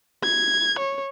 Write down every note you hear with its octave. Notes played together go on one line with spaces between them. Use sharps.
G#6
C#5